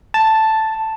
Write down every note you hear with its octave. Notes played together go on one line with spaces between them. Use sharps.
A5